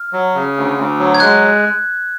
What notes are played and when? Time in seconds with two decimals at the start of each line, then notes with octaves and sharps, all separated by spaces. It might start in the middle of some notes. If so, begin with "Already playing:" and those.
Already playing: F6
0.13 F#3
0.34 C#3
0.56 D2
0.78 D2
0.99 F#3
1.15 G#6
1.20 G#3 F#6